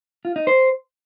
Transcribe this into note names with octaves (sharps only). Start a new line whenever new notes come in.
F4
D#4
C5